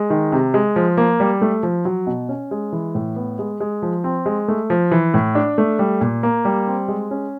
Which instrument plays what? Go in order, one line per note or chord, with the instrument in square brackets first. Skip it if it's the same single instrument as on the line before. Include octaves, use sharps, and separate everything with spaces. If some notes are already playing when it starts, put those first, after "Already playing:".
Already playing: [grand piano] G#3
D#3
C3
G#3
F3
A#3
G3
A3
F3
F#3
B2
C#4
G#3
E3
A2
B3
G#3
G#3
F3
C4
G#3
A3
F3
E3
A2
D4
A3
G3
A#2
A#3
G3
C4
G#3
C#4